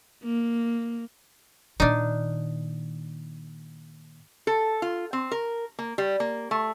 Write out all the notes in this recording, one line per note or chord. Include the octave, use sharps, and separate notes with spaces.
A#3
A#2 D#3 D4 D#4
A4
F4
C4
A#4
A#3
G3
A#3
A3